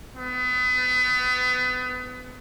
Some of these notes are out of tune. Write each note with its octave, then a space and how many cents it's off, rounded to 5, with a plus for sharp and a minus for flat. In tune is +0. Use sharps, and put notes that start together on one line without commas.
B3 +30